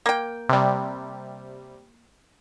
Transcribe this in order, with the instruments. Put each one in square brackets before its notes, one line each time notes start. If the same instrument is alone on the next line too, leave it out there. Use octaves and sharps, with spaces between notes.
[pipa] A#3 G5
[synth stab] C3 G3